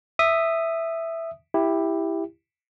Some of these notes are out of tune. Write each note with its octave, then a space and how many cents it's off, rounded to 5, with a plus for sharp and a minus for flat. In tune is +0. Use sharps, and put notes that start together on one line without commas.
E5 +0 D#6 -10
E4 +0 G4 +10